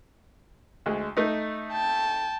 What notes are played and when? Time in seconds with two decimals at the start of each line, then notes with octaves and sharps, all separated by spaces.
0.86 D2 G#3
1.17 A3 D#4
1.71 G5 A5